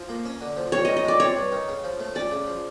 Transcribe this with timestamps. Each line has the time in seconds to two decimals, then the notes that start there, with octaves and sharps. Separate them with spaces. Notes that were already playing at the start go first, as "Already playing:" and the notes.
Already playing: F3
0.09 A#3
0.25 C#4
0.41 D3
0.57 F3
0.72 G2 C#5
0.85 D#3 D#5
0.97 D#5
1.04 G#3 D5
1.20 C4 C#5
1.37 G2
1.52 D#3
1.68 C#3
1.84 F3
2.00 A3
2.15 C#4 D5
2.31 C#3
2.47 F3